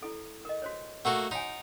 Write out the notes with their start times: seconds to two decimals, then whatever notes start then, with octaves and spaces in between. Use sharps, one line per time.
0.02 E4 A4
0.45 A#4 D#5
0.62 F#4 C5 C#5
1.05 A3 A#3 F#4 F#5
1.31 D#4 F#4 C#5 G#5